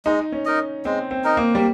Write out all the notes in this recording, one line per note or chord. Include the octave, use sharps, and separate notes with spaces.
G#3 D#4
C#4
D#4 A#4 D#5
G#3 C4
C4
D#4 A#4 D#5
A#3
G3